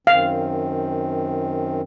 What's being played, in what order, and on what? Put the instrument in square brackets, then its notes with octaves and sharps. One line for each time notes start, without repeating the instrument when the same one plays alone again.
[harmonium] F#2 D#3 C4 [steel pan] F5